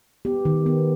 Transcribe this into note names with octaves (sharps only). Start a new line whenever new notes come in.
B3 G4
D#3
B3